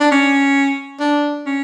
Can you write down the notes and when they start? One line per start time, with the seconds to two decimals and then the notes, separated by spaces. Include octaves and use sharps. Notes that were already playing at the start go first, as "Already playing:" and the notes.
0.01 D4
0.12 C#4
1.00 D4
1.46 C#4